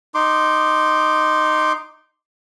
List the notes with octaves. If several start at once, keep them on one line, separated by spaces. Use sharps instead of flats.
D#4 C6 D6